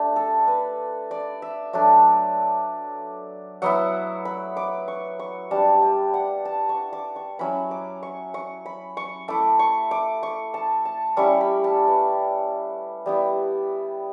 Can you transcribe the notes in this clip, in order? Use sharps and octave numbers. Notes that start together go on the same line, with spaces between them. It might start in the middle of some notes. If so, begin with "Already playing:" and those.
Already playing: A3 D4
A4
B4
D5
E5
F#3 A3 D4
F#3 B3 E4 F#5
B5
D6
C#6
C#6
G3 D4 A5
G5
F#5
A5
C#6
D6
C#6
F#3 C#4 E4 B5
D6
C#6
C#6
B5
C#6
A3 E4 D6
C#6
D6
C#6
A5
A5
G3 C#4 E4 C#6
B5
A5
B4
G3 B3 E4